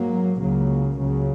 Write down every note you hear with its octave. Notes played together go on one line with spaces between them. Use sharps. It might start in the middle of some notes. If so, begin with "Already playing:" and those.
Already playing: G#2 F#3 A#3
C#2 C#3 F#3 A#3
C#2 C#3 F#3